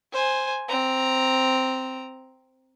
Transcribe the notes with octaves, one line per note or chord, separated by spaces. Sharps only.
C5 G#5
C4 A#5